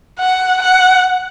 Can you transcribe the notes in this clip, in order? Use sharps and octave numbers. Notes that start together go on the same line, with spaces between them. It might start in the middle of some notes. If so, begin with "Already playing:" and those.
F#5
F#5